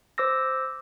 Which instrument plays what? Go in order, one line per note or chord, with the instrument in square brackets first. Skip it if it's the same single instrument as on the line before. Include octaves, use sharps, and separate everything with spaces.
[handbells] C5 D6 E6 A#6